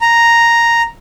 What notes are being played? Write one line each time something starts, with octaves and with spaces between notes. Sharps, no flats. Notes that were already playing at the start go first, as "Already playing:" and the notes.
A#5